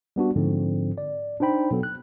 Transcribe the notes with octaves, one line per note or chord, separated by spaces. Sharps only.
G3 B3 D4 F#4
G#2 D3 F3 C4
D5
D4 D#4 C5 G5 B5
B2 F#3 B3 A4
F#6